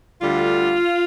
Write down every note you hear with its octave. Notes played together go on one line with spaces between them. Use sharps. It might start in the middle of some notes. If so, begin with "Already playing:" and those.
D2 D3 G3 F4